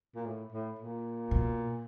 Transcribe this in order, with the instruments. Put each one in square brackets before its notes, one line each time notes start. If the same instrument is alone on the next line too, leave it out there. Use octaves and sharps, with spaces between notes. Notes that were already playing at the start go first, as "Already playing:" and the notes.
[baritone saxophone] A#2
A2
A2
A#2
[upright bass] B2